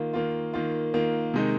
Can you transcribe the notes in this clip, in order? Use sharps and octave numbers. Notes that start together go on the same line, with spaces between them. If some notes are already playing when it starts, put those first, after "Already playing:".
Already playing: D#3 A#3 F4
D#3 A#3 F4
D#3 A#3 F4
D#3 A#3 F4
C3 D#3 G#3 D#4